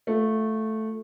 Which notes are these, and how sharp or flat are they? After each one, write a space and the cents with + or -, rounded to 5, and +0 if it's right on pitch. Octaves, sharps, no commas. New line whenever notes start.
A3 -5 F4 +15